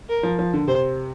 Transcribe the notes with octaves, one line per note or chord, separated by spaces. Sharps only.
A#4
F3
F3
D3
C3 C5